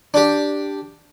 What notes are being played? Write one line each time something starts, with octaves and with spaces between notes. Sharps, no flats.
D4 G4